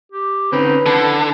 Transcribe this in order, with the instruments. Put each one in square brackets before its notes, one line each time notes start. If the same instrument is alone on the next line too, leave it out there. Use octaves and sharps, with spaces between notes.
[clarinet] G4
[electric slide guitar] D3 C4 C#4 [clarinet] D#4 [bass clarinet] B4
[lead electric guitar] D3 [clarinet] E4 [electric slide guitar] A4